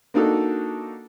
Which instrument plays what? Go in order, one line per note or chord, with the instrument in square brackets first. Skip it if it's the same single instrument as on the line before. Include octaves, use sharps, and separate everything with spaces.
[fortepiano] A#3 D4 D#4 F#4 A4